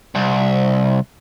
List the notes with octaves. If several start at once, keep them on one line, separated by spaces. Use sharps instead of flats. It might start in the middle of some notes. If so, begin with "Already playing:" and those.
C2